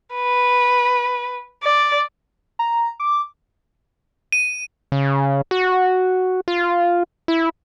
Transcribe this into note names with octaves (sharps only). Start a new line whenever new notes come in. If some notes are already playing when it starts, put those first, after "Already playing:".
B4
D5
A#5
D6
D#7
C#3
F#4
F4
E4